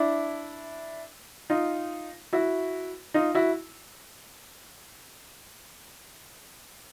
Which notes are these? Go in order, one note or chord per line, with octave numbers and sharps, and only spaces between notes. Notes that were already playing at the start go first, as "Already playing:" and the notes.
Already playing: D4 E4
D#4 F4
E4 F#4
D#4 F4
E4 F#4